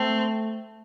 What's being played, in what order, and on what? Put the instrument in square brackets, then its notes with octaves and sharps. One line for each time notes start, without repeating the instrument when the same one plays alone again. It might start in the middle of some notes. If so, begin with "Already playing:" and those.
Already playing: [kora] A3 [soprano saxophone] C4